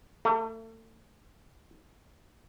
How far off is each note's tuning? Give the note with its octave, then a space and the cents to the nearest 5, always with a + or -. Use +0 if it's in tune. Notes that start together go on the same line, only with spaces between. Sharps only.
A3 +35